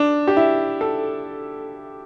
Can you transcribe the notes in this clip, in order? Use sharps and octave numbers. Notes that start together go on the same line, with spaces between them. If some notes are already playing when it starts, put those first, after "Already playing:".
Already playing: D4
G4
E4
A4